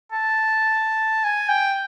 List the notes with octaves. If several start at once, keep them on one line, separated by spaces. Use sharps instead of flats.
A5
G#5
G5